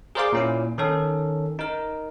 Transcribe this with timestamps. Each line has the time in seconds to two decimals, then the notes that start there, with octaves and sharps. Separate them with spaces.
0.15 G#4 A#4 C5 D5 F5 D6
0.32 A#2 C#4 E4
0.78 D#3 C#4 A4
1.59 D#4 A#4